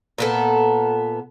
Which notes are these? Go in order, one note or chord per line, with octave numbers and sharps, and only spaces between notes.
A#2 B3 A4